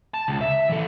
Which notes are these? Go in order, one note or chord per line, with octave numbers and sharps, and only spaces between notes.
A5
C#2
E5
E3 A4